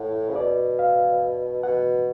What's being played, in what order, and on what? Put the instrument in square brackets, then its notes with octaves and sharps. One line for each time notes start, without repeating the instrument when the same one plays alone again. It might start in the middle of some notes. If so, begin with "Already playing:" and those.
Already playing: [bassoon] A2 [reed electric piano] F#5
[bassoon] C#3
[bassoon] B2 [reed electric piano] D5
[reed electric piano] F5
[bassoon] B2 [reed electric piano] F#5